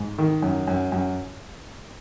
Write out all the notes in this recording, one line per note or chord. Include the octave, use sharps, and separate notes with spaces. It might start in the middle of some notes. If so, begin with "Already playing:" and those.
Already playing: G#2
D#3
F#2
F#2
F#2